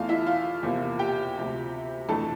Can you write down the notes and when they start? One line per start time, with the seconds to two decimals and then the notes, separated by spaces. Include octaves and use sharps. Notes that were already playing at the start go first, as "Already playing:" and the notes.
Already playing: E2 E3 A3 F4 F5
0.09 E4 E5
0.26 F4 F5
0.63 E2 C3 F3 A#3 F4
0.99 G4 G5
1.36 D2 C3 F3
2.09 F2 E3 A3 D4 A4 A5